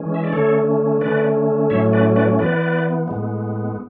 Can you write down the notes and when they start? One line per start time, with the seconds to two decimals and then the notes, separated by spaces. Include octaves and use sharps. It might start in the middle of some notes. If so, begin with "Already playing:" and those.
Already playing: E3 G#3 C#4
0.14 E5
0.24 D5
0.33 D3 A3 C#4 A4 C#5
1.01 D3 A3 C#4 B4 D5
1.70 A2 F#3 A3 C#4 C#5 E5
1.93 B4 D5
2.16 B4 D5
2.39 E3 B3 B4 D5
3.08 A2 G#3 B3